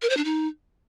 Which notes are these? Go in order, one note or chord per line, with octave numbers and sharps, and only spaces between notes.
A#4
C5
D4
D#4